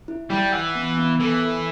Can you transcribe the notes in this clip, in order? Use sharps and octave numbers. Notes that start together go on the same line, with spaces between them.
E4
G3 E4
E3 F#5
B3
B3
E3 A4
A4